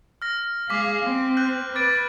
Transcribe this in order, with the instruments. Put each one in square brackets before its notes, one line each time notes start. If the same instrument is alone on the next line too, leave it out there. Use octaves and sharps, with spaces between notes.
[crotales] F6 A#6
[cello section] G#3 G#4 F5 [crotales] D6 B6
[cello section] C4
[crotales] F#6 G6 F#7
[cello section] B4 [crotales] D6 A6 D7